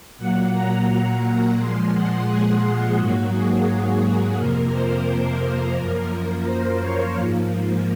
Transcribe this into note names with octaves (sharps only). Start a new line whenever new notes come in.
A#2 F#3 A#3 F#5
A#5
A#2 F3 G#3 C6
F#5
G#4
G#4
G#2 F#3 A#3 F#4
G#4
F2 C3 F3 A#3 A#4
C5
F#2 F3 A#3 A#4
C5
C#5
G#2 F3 A#3